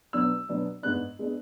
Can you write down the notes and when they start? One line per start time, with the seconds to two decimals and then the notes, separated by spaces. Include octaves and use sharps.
0.13 B2 F#3 B3 D4 E6
0.49 B2 F#3 B3 D4
0.83 G#2 G#3 B3 D4 F#6
1.19 G#3 B3 D4